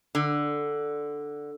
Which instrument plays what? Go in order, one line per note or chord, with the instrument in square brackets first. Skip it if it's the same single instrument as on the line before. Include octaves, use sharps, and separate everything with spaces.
[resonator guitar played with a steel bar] D3